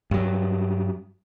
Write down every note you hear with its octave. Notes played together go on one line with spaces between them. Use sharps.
G2 F#3